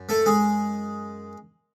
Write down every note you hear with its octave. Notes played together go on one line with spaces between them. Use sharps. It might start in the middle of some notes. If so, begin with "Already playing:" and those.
Already playing: F#2
A3 A4
G#3 G#4